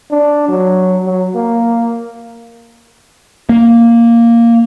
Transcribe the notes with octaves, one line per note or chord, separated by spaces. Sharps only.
D4
F#3
F#3
A#3
A#3